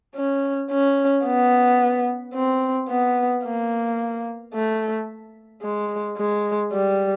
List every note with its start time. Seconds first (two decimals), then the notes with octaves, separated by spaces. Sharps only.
0.16 C#4
0.70 C#4
1.25 B3
2.34 C4
2.89 B3
3.44 A#3
4.54 A3
5.62 G#3
6.17 G#3
6.73 G3